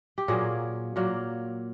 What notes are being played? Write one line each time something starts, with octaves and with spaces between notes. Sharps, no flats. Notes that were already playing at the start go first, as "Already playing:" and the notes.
G4
A#2 F#3 A#3 G#4
A#2 F#3 A#3